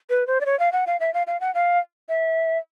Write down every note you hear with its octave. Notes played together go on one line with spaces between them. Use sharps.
B4
C5
D5
C#5
F5
F#5
F5
E5
F5
F5
F#5
F5
E5